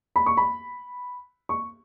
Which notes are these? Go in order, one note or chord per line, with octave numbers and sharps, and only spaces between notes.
B5
C#6
B5
C#6